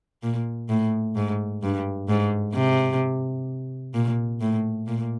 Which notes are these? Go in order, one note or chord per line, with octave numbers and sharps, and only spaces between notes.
A#2
A2
G#2
G2
G#2
C3
A#2
A2
A#2